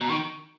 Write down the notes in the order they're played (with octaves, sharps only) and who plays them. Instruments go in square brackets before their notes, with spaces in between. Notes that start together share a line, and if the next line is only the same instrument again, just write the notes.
[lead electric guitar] B2 [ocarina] A#5
[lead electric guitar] D#3 [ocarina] C#6